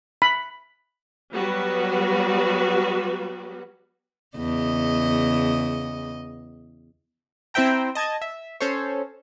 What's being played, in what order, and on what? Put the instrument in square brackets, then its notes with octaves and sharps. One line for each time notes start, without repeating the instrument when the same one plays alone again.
[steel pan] B5
[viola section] F#3 G3 B3 F#4 B4
[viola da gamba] E2 C#3 D#5
[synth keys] C4 E4 C5 E5 G5 A#5
D#5 A5 G#6
E5
C#4 A4 C5 C#5